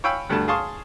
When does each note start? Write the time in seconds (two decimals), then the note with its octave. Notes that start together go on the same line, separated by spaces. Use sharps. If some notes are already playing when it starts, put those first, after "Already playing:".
0.04 C#5 F5 G5 G#5 B5 E6
0.30 D2 G2 A3 A5
0.48 G#4 F5 A5 C6 C#6 D#6